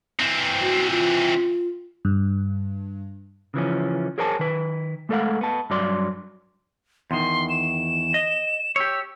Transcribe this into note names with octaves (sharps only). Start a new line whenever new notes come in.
E3 C4
F#4
F4
G2
C#3 E3 F3 C#4
G#4 A#4 C5 C#5 G#5 A5
D#3 B4
G#3 A3 A4 C5 F5 F#5
B3 A5
G2 F#3 D5 C6
E2 D#3 C6
E7
D#5
G4 C#5 E6